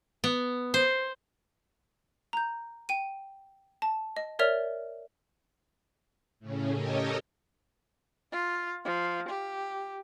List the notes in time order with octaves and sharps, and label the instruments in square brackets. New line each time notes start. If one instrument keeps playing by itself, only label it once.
[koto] B3
C5
[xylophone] A#5 G6
G5 D#7
A5
D#5
A#4 C#5 D5 E5 F6 F7
[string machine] A2 C#3 C#4
G4 A4 A#4 C#5 D#5
[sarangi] F4
F3
G4